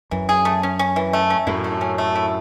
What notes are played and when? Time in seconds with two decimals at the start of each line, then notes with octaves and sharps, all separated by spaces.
0.11 F#2 E3
0.29 G#4
0.45 A3
0.63 C#4
0.79 C#4
0.96 E3
1.13 A3
1.30 C#4
1.47 F#2 A2 E4
1.64 A3
1.81 C#4
1.98 A3
2.15 E4